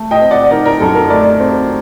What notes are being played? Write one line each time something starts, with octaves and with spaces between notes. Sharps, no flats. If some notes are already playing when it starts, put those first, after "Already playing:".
Already playing: A3
D#5 G5
C4
D5 F#5
D#3 A#4 D5
A#4
F#2 A4
A#4
A3 A#4 D5
C4